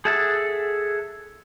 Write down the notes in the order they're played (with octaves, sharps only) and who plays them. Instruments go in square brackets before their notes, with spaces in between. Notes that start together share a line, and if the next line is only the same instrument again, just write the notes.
[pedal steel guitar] G#4 A4 E5 F#5 A5